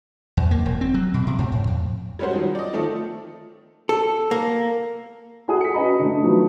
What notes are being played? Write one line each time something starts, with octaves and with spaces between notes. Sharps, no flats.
E2
A#3
E1
C4
F#3
B2
C3
G#2
A2
F2
G3 G#3 C#4 F#4 C5
D#3 F3 F#3
D5 D#5
D#3 F3 A3 A4
A4
A#3
E4 F#4 G#4 A4 F#5 D#6
B6 C#7
C#4 F#4 B4 D#5 A#5 B5
D3 A3
D#3 F3 F#3 A3 B3 F4